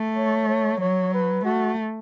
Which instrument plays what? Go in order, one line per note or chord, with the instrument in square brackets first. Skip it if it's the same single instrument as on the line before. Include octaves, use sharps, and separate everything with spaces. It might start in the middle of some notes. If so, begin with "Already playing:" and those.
Already playing: [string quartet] A3
[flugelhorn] C#5
C#5
[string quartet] F#3 [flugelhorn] C#5
[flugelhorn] B4
[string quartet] A3 [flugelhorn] F#4